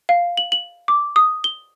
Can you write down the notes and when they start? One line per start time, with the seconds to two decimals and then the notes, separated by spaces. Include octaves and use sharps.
0.09 F5
0.37 F#7
0.52 F#7
0.88 D6
1.16 D#6
1.44 G7